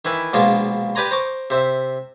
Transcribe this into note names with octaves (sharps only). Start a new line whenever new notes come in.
D#3 E3 E4 B4
A#1 B2 G#3 D4 F4 C6
G4 B4 D5 G#5 A#5 C6
C5 A#5 C#6 D6
C3 C5 E5